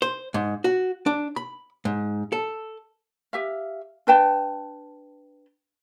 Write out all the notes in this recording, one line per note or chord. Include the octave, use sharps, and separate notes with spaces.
C5
G#2
F#4
D4
B5
G#2
A4
G4 E5 F5
D4 B4 G5 A5